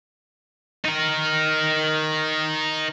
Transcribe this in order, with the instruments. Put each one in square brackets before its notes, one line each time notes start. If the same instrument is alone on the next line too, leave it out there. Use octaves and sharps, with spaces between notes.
[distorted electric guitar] D#4 A#4